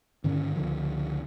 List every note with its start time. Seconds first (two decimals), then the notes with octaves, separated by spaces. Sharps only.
0.24 G2 D3 D#3 C#4
0.55 C#2 D3 F3